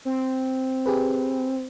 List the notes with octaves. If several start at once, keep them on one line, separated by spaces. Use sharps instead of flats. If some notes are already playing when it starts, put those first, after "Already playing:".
C4
G4 G#4 B4